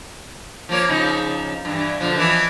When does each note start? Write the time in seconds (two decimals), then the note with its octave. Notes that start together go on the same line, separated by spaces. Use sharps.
0.69 F3 A#3 C#5
0.89 C#3 F3 D#4
1.65 G2 E3
2.00 B2 D3 F3
2.17 E3 F3 B3